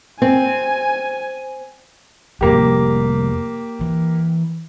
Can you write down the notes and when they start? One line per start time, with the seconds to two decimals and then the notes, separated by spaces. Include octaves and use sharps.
0.22 C4 G#5
2.41 F2 C3 G3 A#3 G4
3.81 E3